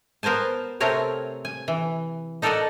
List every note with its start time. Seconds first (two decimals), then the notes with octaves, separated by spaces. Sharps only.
0.23 B3 A#4 C5 G#5 A5
0.80 C3 A3 C4 A#4 C#5 G#5
1.45 G#5
1.68 E3
2.42 D#4 A4 A#4 D5 D#5 F#5